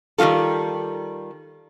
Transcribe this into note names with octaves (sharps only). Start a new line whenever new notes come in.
D#3 G3 G#3 F4 A4